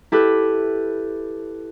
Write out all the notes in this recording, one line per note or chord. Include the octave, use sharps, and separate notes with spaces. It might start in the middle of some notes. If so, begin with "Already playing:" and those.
E4 G4 A4 B4